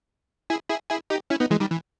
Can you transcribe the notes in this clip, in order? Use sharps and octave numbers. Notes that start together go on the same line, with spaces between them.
E4 G#4
E4 G#4
E4 G#4
D#4 G4
C#4 E4
B3 D#4
E3 G#3
D#3 G3
E3